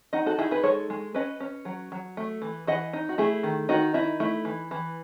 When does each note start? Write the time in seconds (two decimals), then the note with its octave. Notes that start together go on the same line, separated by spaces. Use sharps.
0.13 D#4 D#5 F#5
0.26 F#4 A4
0.38 D#4 E4 G#4
0.51 G#4 B4
0.63 G#3 A4 C#5
0.90 G#3
1.14 C#4 B4 D#5
1.40 C#4
1.65 F#3
1.92 F#3
2.17 A3
2.42 E3
2.67 E3 D#5 F#5
2.93 D#4
3.09 F#4
3.18 A3 E4 G#4
3.43 D#3
3.69 D#3 D#4 F#4
3.94 D#4 E4
4.20 A3 E4
4.45 E3
4.71 E3